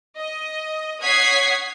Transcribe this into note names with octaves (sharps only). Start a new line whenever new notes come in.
D#5
C#5 F#5 D#6 G#6 B6 C7